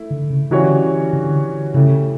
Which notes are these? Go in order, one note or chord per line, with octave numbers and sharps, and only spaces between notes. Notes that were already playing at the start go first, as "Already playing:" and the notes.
Already playing: A3 E4
D3
C#3
D3 E3 G3 C#4 F#4 C#5
D3
C#3 A3 E4 G4